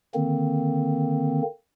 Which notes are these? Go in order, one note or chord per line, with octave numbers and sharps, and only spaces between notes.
D3 D#3 A#3 C4